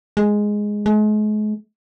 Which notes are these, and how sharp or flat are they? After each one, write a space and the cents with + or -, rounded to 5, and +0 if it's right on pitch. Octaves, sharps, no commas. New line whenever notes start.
G#3 +0
G#3 +40